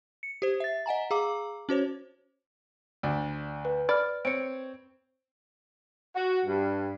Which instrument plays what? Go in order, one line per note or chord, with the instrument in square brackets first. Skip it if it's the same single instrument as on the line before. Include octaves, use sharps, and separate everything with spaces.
[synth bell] C#7
G4 C5
E5 A6
D#5 F#5 G#5 A#5
G#4 F5 A#5 D6
C#4 F#4 C5 C#5
[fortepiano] D2 D4 D5
[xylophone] B4
[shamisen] D5 [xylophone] B5 F6
[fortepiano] C4 C#5 [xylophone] C#7 D7
[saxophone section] F#4
G2